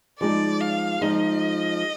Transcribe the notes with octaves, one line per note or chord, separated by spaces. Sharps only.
F3 G#3 D#4 D5
F5
F3 G#3 D#4 D#5